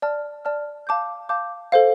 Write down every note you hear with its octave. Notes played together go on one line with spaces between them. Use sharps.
D5 A5 F6
D5 A5 F6
F5 A5 D6 G6
F5 A5 D6 G6
A4 C5 F5